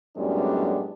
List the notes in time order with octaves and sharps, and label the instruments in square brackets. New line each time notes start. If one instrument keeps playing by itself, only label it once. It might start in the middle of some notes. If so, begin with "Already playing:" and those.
[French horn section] F#2 A2 G3 G#3 B3 D4